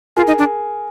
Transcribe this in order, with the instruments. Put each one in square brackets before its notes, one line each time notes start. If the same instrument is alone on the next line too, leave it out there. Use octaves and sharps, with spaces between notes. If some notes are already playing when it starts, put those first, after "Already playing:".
[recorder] F4 [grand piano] G#4 A#4
[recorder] D#4
D4